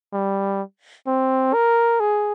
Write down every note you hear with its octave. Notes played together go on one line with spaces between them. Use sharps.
G3
C4
A#4
G#4